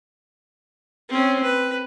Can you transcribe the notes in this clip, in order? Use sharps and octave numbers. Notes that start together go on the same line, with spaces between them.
C4 C#4
B4